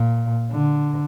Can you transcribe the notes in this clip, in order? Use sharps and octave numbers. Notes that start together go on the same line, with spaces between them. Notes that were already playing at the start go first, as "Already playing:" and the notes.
Already playing: A#2
D3